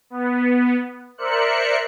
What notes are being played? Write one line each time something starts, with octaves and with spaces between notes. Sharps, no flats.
B3
A#4 C5 D5 E5 F#6 C#7